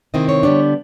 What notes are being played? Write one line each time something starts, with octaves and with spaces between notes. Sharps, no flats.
C3 D#3 G#3 C4 E4 D#5
C#5
D3 G3 B3 D4